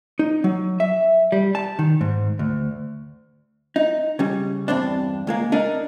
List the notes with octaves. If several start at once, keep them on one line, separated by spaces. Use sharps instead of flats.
D#4
F#3
E5
G3
A5
D#3
G#2
D2
D#4
C#3 G3
E2 G2 C4 D4
C#2 G#3 A#3
D4 D#4 A#4